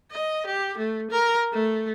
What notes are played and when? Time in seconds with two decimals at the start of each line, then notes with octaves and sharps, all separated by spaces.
0.12 D#5
0.46 G4
0.78 A3
1.11 A#4
1.53 A3